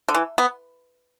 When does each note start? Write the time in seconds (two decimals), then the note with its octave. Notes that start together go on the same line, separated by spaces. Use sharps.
0.08 D3
0.15 E3
0.38 B3